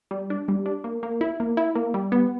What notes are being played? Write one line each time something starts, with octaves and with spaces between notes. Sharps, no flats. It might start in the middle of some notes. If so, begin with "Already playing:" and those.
G3
D4
G3
D4
A#3
A#3
E4
A#3
E4
A#3
G3
B3